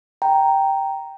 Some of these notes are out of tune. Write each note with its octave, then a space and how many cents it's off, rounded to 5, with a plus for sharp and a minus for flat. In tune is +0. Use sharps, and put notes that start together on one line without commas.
G5 +0 A#5 +0